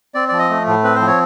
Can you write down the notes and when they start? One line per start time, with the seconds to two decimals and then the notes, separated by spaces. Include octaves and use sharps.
0.15 C4 D5
0.28 F3 D5
0.39 D#5
0.50 A3
0.67 A2
0.84 C4 B4
0.95 C5
1.01 F3
1.07 C#5